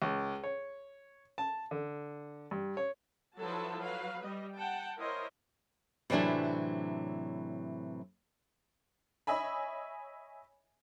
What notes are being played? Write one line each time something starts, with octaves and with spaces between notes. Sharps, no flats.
C#2
C#5
A5
D3
G2
C#5
F3 F#3 E4 A4 B4 A5
F#3 B4 F5
G3 D#5
F#5 G5 A5
E4 A#4 C5 C#5 D#5
A2 C3 E3 F#3 D4 E4
C#5 D#5 E5 G#5 B5